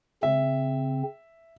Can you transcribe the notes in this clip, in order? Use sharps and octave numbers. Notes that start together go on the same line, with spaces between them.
C#3 C4 E5